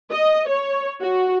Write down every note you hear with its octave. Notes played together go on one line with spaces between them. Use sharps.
D#5
C#5
F#4